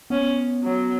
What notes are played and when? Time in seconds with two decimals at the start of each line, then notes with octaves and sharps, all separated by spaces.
0.10 B3 C#4
0.64 F#3